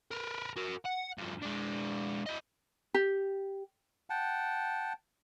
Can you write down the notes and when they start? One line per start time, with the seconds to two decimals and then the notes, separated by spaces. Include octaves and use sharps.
0.11 A#4 B4
0.57 F#4 A#4
0.85 F#5
1.18 G2 F3
1.42 G#3 D4
2.26 E4 D#5
2.94 G4
4.10 F#5 G5 A5